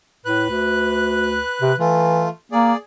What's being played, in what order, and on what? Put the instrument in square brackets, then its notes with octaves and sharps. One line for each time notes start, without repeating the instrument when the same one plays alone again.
[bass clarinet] A2 [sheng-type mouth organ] B4 F#6
[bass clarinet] D2
C3
[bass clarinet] E3 [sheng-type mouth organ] A3 F4
[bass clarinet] A#3 [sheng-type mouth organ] G#4 D5